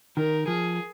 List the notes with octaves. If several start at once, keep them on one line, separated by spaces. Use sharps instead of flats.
D#3 A#4
F3 G#4